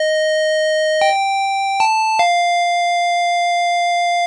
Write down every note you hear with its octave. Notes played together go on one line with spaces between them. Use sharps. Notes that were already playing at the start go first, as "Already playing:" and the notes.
Already playing: D#5
G5
A5
F5